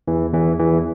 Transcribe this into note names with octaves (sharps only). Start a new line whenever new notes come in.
E2 E3
E2 E3
E2 E3